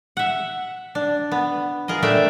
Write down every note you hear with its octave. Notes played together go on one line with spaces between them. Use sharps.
E5 F#5
D4
B3
F4 G#4 A#4 D#5
A#2 A3 D4 C5 E5 G5